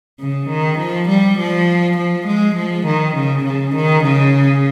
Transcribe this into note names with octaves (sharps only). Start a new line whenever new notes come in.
C#3
D#3
F3
G3
F3
F3
G#3
F3
D#3
C#3
C#3
D#3
C#3